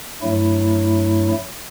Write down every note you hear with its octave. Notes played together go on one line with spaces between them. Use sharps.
G2 F#3 A3 E4